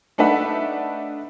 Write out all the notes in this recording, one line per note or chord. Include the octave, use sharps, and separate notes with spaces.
A3 D4 D#4 B4 E5 F#5